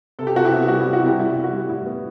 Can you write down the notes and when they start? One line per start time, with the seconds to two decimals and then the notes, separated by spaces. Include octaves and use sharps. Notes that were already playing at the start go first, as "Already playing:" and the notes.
0.19 C3 A4
0.27 G4
0.35 C3 F#4
0.45 E4 G4
0.52 B3
0.68 G3 F#4
0.81 G3 E4
0.93 F#4
1.03 C3 E4 G4
1.19 G3 E4
1.36 G3
1.44 F#4
1.53 G3
1.68 A2 E4
1.86 B3